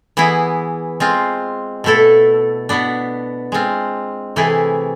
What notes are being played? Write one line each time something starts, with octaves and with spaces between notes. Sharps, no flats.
E3 B3 E4 G#4
G#3 C4 F4
B2 A3 E4 A4
B2 B3 D4
G#3 C4 F4
C3 E3 A3 E4 G#4